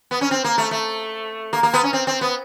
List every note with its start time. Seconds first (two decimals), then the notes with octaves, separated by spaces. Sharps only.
0.11 B3
0.21 C#4
0.31 C4
0.44 A#3
0.58 A3
0.71 A3
1.53 A#3
1.63 A#3
1.74 B3
1.84 C#4
1.93 C4
2.07 C4
2.21 B3